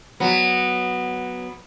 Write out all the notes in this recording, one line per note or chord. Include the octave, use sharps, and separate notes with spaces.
F#3 B3